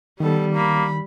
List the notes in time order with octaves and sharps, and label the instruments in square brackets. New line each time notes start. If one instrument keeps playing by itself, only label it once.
[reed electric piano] D#3 [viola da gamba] G3 [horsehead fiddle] B3 A4
[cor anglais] A#3 [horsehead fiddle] B5